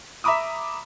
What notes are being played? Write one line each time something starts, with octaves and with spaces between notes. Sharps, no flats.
E5 A#5 B5 D6 D#6